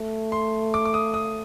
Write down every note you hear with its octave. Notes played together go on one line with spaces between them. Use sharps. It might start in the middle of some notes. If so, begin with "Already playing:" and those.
Already playing: A3
C6
D6
D6
D#6
D#6